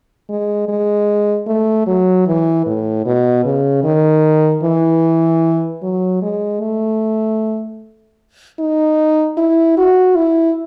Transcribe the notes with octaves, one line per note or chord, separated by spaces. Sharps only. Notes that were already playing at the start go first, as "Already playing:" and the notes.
G#3
G#3
A3
F#3
E3
A2
B2
C#3
D#3
E3
F#3
G#3
A3
D#4
E4
F#4
E4